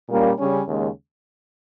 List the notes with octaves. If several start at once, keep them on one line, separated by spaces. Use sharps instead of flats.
A#2 G3 A#3 C#4
C#3 G3 C#4
D#2 C#3 G#3